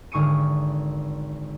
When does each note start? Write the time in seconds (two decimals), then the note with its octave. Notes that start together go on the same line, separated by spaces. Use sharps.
0.12 G#1 D3 C#6 D#6 C#7 D#7